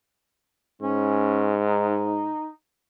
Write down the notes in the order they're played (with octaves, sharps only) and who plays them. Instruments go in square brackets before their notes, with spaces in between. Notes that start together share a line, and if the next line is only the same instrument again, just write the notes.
[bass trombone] G#2 [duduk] C#4
[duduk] D#4